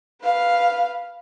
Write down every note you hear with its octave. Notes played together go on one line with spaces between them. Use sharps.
B4 F5